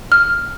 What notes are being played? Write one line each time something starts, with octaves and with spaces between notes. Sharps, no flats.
F6